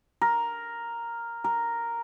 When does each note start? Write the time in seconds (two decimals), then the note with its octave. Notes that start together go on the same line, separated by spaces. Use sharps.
0.22 A#4
1.44 A#4